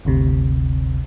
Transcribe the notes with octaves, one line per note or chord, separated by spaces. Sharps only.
G1 D2 C3